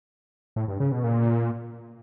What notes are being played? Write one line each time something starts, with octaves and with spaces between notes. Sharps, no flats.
A2
G2
C#3
B2
A#2